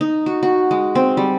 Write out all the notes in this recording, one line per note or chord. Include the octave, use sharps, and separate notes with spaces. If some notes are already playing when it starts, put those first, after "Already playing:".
D#4
F#4
F#4
G#3
C4
G3